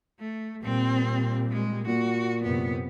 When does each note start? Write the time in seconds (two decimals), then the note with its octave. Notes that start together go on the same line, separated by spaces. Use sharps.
0.19 A3
0.63 A#2 G3 C4
1.51 G#3
1.87 A#2 F#4
2.43 F#2 C3 B3